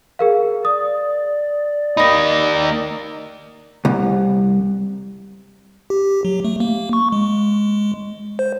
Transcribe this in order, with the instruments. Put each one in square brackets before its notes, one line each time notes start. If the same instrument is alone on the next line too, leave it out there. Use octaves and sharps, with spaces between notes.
[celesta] G#4 A#4 F5
[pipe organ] D5 [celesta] D#6
[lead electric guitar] A#3 D#4 [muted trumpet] D#5 [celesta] B5 A#6
[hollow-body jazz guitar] C2
[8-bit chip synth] G4
F#3
A3
A#3
C#6
G#3
C5